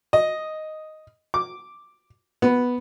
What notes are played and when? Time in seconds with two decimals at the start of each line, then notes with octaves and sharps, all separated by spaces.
0.13 D#5
1.34 D6
2.42 B3